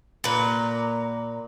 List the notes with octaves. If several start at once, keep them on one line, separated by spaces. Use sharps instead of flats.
A#2 B4 A#5